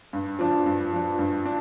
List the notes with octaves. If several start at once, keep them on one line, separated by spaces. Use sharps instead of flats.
G2
F3 D4
G2
F3 D4
G2
D4